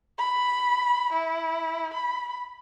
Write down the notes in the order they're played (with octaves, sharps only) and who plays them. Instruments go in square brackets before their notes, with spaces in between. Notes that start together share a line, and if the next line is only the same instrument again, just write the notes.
[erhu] B5
E4
B5